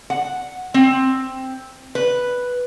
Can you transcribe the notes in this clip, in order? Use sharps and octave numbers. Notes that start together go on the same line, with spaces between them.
F#5
C4
B4